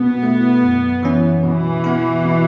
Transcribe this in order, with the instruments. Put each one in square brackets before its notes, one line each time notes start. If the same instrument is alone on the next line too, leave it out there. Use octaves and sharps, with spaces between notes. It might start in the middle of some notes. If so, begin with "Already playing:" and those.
Already playing: [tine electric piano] B2 [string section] B3
[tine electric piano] A3 E4
F#2
E3 C#4 E4
[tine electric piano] B2 [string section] E3
[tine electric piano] B3 E4
B2